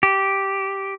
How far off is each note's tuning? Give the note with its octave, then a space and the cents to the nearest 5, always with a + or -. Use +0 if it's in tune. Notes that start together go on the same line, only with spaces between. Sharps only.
G4 -5